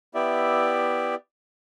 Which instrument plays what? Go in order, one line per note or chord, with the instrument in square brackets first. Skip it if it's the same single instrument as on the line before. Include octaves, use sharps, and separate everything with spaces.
[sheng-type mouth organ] B3 E4 G4 D5 E5